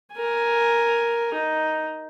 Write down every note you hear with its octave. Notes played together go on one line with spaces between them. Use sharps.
A#4 G#5
D#4